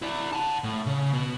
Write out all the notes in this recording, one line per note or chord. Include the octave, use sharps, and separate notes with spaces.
E4 D5
F#5 A5
A2
C#3
B2